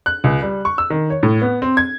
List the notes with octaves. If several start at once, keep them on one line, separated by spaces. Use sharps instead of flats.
F#6
C#2
G3
C#6
E6
D#3
C#5
A2
B3
C4
G#6